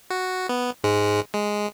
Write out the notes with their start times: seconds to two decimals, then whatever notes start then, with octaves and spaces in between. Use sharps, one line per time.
0.10 F#4
0.49 B3
0.84 G#2 G#3
1.34 G#3